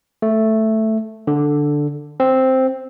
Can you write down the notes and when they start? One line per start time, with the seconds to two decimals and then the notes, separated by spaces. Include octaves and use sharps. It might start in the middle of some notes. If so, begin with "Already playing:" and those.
0.22 A3
1.27 D3
2.20 C4